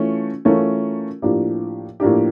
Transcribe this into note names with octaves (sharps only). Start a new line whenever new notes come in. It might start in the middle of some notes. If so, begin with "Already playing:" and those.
Already playing: E3 A3 C#4 F4
E3 A3 C#4 F4 A#4
A2 F3 A#3 D4 G4
A2 F3 A#3 D4 G4